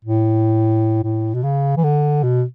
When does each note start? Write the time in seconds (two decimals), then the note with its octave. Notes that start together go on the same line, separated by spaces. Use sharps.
0.05 A2
1.03 A2
1.34 B2
1.43 C#3
1.77 E3
1.84 D3
2.23 B2